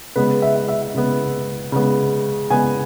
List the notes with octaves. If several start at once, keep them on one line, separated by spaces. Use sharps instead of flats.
C#3 G#3 B3 B4
E5
E5
C#3 G#3 B3
C#3 G#3 B3
C#3 G#3 B3 G#5